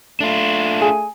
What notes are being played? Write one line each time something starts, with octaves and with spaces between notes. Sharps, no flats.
A3 D4 F4
G#4 G#5